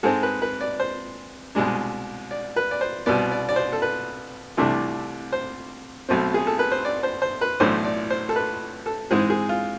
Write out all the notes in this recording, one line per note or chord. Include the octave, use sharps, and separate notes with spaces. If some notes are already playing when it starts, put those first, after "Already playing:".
G#2 G#3 C4 A4
B4
B4
D5
C5
C2 B2 G#3 D4
D5
B4
D5
C5
C2 B2 B3 D5
D5
D5
C5
A4
B4
C2 C3 E3 A3 D4
C5
B1 B2 A3 C4
G#4
A4
B4
C5
D5
C5
C5
B4
B1 A2 E3 A3 D4 C5
D5
C5
A4
B4
A4
G#2 E3 G#3 C4 G#4
G#4
F4